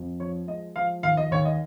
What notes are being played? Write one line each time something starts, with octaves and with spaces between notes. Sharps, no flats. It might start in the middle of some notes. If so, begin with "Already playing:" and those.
Already playing: F2
F3 C#5
G#3 D#5
F3 F5
D#2 F5
D#5
D#2 C#5
D#5